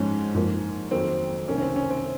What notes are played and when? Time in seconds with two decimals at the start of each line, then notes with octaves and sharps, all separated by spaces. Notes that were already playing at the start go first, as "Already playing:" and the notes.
Already playing: G#2 F3 G#3 C#4
0.34 G#2 F3 A#3
0.91 F2 D#3 F#3 A#3 C4
1.48 C2 C3 D#3 A#3 C#4
1.58 C#4
1.62 C4
1.76 C#4
1.90 C4